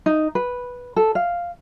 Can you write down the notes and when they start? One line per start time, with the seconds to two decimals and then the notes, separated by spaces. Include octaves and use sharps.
0.06 D#4
0.35 B4
0.96 A4
1.15 F5